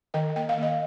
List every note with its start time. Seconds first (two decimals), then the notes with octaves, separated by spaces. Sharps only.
0.14 D#3 D#5 G5
0.36 A#3 G5
0.49 F5
0.58 A#3 D#5